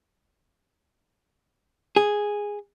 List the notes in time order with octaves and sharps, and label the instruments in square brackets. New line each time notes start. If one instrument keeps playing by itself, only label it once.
[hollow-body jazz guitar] G#4